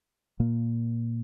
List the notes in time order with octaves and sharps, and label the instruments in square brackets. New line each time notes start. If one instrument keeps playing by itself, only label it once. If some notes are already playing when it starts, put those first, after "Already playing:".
[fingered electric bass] A#2 A#3